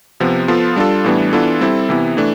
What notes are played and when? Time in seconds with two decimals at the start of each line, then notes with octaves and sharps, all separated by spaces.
0.20 C3 F3 B3
0.48 F3 B3 F4 A4
0.76 G3 D4 F4 A4
1.04 A2 E3 G3 B3 D4
1.33 E3 B3 D4 F4 A4
1.61 G3 C4 E4 A4
1.89 C3 E3 B3 E4
2.17 E3 A3 D4